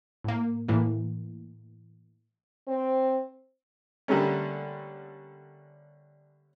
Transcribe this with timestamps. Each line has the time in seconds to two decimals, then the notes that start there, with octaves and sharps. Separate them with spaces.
0.24 A2 A#3
0.68 A2 E3 A#3
2.68 C4
4.08 D3 G3 A3 A#3 C#4